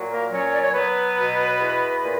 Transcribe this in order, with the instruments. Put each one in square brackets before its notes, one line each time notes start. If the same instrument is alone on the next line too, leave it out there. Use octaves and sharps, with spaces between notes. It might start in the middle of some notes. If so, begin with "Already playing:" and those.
Already playing: [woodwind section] A#2 F#3
A#3 A#4
F#3 C#4 C#5
D5
C#5
F#3 B3 B4
B2
E2
A#2